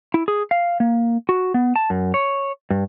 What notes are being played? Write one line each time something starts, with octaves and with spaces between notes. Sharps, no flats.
E4
G#4
F5
A#3
F#4
B3
A5
F#2
C#5
G2